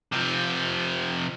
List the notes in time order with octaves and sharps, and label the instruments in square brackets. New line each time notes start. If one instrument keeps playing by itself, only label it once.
[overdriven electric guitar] C3 F3